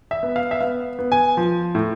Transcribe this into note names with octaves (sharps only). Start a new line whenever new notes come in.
E5
B3
F5
E5
B3 F5
B3
G#5
F3
A2